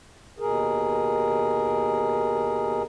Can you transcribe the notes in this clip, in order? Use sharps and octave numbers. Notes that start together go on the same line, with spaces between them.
D#2 B2 G#4 A#4